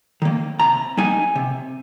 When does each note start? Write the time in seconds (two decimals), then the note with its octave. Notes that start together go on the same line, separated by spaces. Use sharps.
0.22 D#3 A#3
0.60 C3 A#5
0.97 G3 A#3 D#4 G#5
1.36 C3